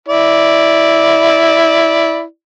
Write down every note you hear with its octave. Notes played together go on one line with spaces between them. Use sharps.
E4 D5